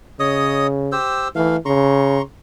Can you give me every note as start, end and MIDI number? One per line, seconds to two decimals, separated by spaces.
0.20 0.95 49
0.20 0.67 73
0.20 0.67 75
0.20 0.67 87
0.92 1.28 67
0.92 1.28 72
0.92 1.28 88
1.35 1.57 52
1.35 1.56 57
1.35 1.56 77
1.65 2.20 49
1.65 2.22 82
1.65 2.22 84
1.65 2.22 85